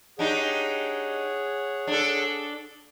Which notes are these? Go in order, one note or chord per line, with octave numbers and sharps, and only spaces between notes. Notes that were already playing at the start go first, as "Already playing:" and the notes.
D4 D#4 G4 G#4 C#5 F#5
D4 A4